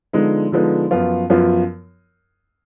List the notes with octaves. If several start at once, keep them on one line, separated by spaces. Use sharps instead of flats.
D3 F3 G#3 B3 D#4
D3 F3 G#3 B3 D#4
F#2 F3 B3 F4
F#2 F3 B3 F4